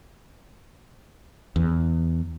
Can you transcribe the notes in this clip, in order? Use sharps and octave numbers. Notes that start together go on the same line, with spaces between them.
E2